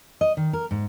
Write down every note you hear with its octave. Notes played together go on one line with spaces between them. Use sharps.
D#5
D#3
A#4
G#2